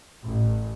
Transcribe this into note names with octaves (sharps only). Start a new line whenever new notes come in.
A1